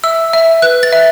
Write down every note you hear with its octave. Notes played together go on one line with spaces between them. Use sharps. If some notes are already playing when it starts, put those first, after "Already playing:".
E5 E6
E5
B4 F#6
A6
E5